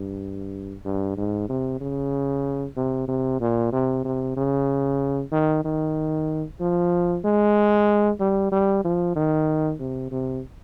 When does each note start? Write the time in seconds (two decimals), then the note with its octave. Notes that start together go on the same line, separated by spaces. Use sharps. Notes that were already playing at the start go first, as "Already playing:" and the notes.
Already playing: G2
0.85 G2
1.17 G#2
1.49 C3
1.81 C#3
2.77 C3
3.09 C3
3.41 A#2
3.72 C3
4.05 C3
4.37 C#3
5.32 D#3
5.65 D#3
6.61 F3
7.25 G#3
8.20 G3
8.52 G3
8.85 F3
9.16 D#3
9.80 C3
10.12 C3